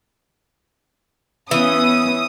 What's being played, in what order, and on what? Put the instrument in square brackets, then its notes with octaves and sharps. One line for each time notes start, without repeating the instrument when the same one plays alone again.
[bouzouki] E3 [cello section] B3 C#4 [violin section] D#6